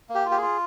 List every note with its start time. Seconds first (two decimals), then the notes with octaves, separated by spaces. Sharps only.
0.09 A#3
0.15 G4
0.25 F4
0.31 G4
0.37 F4 G#4